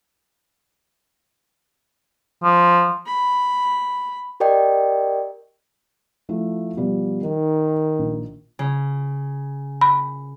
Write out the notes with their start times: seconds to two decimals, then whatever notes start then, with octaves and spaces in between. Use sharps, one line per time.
2.43 F3
3.06 B5
4.40 G4 A#4 D5 D#5 G5
6.29 F3 A3 E4
6.77 B2 F3 G3
7.24 D#3 D#4
7.99 A#1
8.59 C#3
9.81 B5